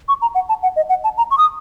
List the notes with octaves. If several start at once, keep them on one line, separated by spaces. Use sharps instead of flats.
C#6
A#5
F#5
A5
F#5
D#5
F#5
A5
A#5
C#6
D#6